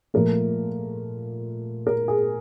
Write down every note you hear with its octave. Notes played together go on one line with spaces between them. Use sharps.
A#2 F3 A3 A#4
A#4
G#4